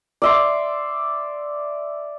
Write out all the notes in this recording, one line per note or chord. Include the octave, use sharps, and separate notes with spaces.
D5 E5 C6